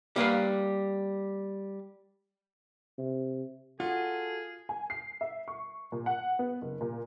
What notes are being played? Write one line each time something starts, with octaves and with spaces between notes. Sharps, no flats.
G3 A#3 B4 F5
C3
F4 F#4 G#4 A4
G#5
C7
E5
C#6
A#2
F#5
B3
F#1
A#2